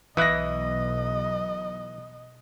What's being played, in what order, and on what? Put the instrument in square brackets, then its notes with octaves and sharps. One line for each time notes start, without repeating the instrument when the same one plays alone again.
[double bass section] B1 [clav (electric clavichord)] E3 E4 [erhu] D#5 [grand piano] D#6 F#6 A#6